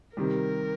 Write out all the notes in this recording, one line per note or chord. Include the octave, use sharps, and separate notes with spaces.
C3 D#3 G3 A#4